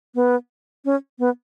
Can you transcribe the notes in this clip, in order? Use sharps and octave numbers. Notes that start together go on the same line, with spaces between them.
B3
C#4
B3